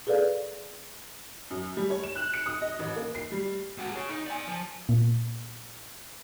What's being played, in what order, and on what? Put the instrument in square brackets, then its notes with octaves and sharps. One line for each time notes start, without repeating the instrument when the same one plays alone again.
[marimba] G#4 A4 B4 D5 F5
[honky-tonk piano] F#2
G3
C#5
E7
F#6
C#7
D#6
D#5
A1
A#3
C7
G3
[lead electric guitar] G#2 F#4
G#4 C#5
D#4
D5 G#5
F3
[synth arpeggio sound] A#2